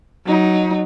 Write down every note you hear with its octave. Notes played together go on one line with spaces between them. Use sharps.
F#3 D#4